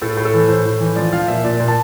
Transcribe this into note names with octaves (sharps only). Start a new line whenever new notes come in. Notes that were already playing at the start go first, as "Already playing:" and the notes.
A2 A4
A2
A4
E3
A2 C5
A2
E3
F3 D5
F3 F5
A#2 E5
A#2 D5
A#2
A5